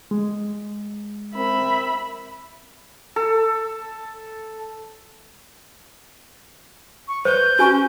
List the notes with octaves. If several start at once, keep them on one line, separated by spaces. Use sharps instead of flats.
G#3
C4 A#4 E5 B5
A4
C#6
B4 C5 G6
C#4 F#4 G#5 C#6